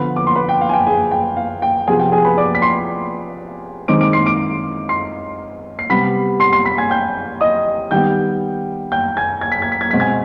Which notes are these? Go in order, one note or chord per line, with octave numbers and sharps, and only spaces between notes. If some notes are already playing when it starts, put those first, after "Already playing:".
Already playing: D3 F3 B3 B4 B5
D6
C6
B4 B5
G5
F5
G#5
G5
G#4 G#5
G5
F5
G5
C3 F3 B3 G#4 G#5
G5
G#4 G#5
B4 B5
D5 D6
B6
C6 C7
D#3 G#3 C4 D6 D7
D6 D7
C6 C7
D6 D7
C6 C7
C7
C3 G3 B3 B5 B6
C6 C7
C6 C7
B5 B6
G#5 G#6
G5 G6
D#5 D#6
D#3 G3 B3 G5 G6
G5 G6
G#5 G#6
G#6
B6
G#6
B6
G#6
B2 G#3 C4 B6
G#5 G#6